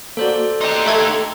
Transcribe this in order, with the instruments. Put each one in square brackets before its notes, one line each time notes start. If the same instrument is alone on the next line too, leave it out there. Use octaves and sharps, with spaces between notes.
[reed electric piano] A#3 F#4 [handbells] A4 C5 D5
[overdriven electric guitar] D#4 G4 [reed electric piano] G5 C6
[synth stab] A3 A4 G#6
[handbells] A#5